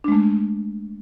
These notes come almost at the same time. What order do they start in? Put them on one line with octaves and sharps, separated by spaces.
D4 G#3 A3